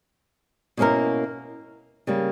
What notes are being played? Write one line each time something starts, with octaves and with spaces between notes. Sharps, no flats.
B2 A#3 C#4 E4 A#4
C#3 G3 A#3